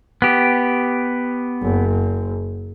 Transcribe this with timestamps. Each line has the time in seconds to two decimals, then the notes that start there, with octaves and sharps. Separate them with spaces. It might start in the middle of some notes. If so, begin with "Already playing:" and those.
0.22 B3 G4
1.62 F#1